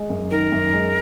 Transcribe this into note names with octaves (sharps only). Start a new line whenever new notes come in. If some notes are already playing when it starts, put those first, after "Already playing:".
Already playing: G#3
F#2
D#3 A#4
F#2
G#3